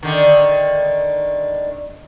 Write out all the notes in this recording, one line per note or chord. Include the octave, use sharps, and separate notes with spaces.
D3 D#3